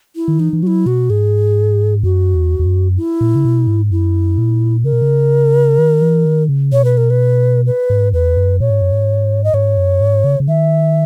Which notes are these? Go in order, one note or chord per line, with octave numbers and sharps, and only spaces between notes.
E4
D#3
E3 D#4
E3
F#3 E4 F#4
B2 F#4
G#2 G#4
F#2 F#4
E2
E2
F#2
E4
A#2
C#3
B2
G#2
F#2 E4
A#2
C#3 A#4
B2
C#3
D#3
E3
D#3
C#3
B2 C#5
B4
A#4
B4
B4
G#2
E2 B4
F#2
A#2 C#5
G#2
F#2
G#2
D#5
G#2 C#5
F#2
G#2
C#3
C#3
D#3 E5